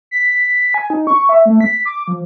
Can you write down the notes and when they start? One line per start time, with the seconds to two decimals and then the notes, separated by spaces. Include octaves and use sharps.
0.11 B6
0.74 G#5
0.90 D#4
1.07 C#6
1.29 E5
1.45 A3
1.61 B6
1.85 D6
2.08 F3